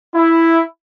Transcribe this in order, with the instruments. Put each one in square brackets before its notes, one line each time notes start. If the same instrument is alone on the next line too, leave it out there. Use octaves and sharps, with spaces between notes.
[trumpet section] E4